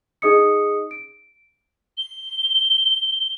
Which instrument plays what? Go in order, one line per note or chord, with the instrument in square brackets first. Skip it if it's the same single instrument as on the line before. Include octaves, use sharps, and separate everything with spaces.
[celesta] D#4 G#4 D#5 D#6 C#7
D7
[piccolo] G7